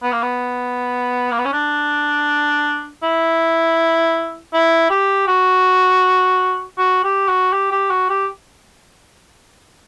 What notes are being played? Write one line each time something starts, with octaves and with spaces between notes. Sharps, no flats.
B3
A#3
B3
A#3
B3
C#4
D4
E4
E4
G4
F#4
F#4
G4
F#4
G4
G4
F#4
G4